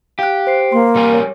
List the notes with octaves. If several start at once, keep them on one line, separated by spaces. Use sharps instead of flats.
G4 F5 F#6
C5 C7
A#3 C6
G3 A#4 G#5
C#5